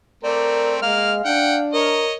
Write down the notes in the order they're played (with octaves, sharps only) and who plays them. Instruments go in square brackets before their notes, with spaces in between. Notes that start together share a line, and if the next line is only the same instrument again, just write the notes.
[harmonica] A3 C4 [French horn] A#4 [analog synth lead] D5
[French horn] G#3 [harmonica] A#3 F6 [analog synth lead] F5
[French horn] D4 [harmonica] F#5 G5
[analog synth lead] A#4 [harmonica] C#5 D#5